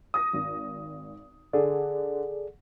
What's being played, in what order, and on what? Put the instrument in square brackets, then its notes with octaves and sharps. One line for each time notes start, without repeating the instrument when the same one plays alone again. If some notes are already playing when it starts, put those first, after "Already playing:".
[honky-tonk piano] D#6 A#6
G#1
[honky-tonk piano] D3 [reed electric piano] G#4 A4 D5